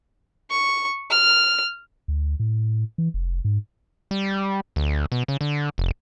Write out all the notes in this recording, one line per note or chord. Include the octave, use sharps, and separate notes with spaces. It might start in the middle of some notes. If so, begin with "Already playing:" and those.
C#6
F6
D2
A2
E3
F1
G#2
G3
D2
B2
C#3
D3
F1